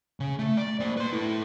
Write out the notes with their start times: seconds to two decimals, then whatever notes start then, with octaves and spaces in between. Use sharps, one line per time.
0.20 C#3 C#5
0.39 A3
0.57 D5
0.80 A#3 C5
0.97 B4 C6
1.13 E4 A4